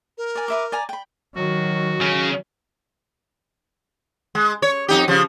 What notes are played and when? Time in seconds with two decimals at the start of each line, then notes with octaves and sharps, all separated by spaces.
0.18 A#4
0.35 D5 G#5
0.48 B4 E5 D6
0.72 D5 G#5 A#5
0.89 G5 B5
1.35 D#3 F#3 F#4
2.02 C#3 C#4
4.35 G#3
4.62 C#5
4.88 F2 D#4 G4
5.08 C#3 F3